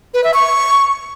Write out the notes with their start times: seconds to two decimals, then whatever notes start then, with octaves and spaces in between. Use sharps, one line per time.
0.14 B4
0.24 E5
0.34 C#6